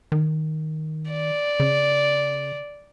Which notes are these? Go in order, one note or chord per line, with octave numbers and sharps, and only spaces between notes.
D#3
D5
C#3